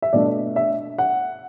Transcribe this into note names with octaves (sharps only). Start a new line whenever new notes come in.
E5
B2 A3 D4 D5
E5
F#5